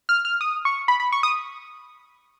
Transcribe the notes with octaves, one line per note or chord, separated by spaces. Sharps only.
F6
F6
D#6
C#6
B5
B5
C#6
D#6